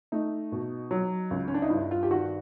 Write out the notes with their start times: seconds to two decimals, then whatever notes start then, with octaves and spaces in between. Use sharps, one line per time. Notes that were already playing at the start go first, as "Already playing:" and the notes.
0.12 A3 D#4
0.52 B2
0.91 F#3
1.31 C#2
1.48 C#4
1.54 D4
1.62 D#4
1.70 G2 E4
1.91 F4
2.03 G4
2.10 D#3 F#4